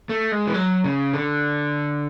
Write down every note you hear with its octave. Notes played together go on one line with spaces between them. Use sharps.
A3
G#3
E3
F#3
C#3
D3